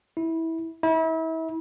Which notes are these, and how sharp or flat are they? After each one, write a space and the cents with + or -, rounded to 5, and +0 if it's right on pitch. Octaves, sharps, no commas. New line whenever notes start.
E4 -20
E4 -35